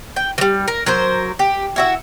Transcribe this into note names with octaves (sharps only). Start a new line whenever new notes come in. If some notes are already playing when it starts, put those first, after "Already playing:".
G5
E3 G3
A#4
F#3 A#4 C5
G4
E4 F#4 E5